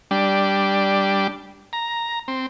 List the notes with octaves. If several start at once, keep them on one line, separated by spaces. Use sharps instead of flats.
G3 D4
A#5
C4